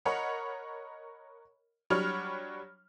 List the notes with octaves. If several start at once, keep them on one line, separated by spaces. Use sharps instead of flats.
A#4 C#5 D#5 F#5 B5
F#3 G3 D4 C#5 B5 F6